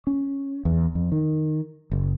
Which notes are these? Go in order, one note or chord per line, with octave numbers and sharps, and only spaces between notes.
C#4
E2
F2
D#3
F#1